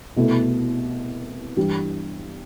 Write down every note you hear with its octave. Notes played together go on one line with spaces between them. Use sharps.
C2 B2 A3 E4
G2 E3 G3